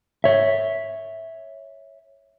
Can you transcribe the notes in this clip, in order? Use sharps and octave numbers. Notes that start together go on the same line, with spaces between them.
C#5 E5